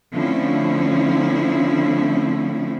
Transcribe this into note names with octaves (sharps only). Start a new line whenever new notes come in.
D3 F3 A3 C4 C#4 E4